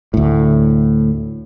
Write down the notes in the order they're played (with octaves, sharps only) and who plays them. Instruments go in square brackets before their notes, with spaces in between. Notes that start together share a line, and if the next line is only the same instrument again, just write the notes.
[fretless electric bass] D2 A2